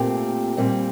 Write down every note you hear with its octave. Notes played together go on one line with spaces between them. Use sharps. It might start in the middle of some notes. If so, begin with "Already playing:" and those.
Already playing: A#2 A3 C4 G4
A#2 G3 C4